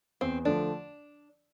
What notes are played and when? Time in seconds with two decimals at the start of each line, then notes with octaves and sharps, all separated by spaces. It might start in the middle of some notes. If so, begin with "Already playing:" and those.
0.21 E2 C4
0.45 D3 F3 A3 D4